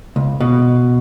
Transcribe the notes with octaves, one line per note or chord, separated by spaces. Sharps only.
C#2
B2